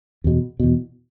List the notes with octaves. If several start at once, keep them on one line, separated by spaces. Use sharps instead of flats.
E2 B2
E2 B2